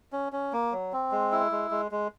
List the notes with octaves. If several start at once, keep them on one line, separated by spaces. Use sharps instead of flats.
C#4
C#4
A#3
F#3
C4
G#3
E4
G#3
G#3
G#3